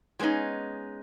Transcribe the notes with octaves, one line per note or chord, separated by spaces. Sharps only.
F#3 G#3 B3 C#4 D#4